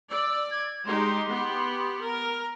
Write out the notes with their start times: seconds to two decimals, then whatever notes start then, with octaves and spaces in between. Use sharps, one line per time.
0.11 D5 E6
0.51 G#6
0.86 G#3 D#4 G4 C6
1.28 B3 G4
2.01 A#4